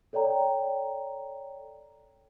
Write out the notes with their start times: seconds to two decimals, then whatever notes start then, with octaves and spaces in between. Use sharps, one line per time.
0.13 A4 C#5 D5 G5 A#5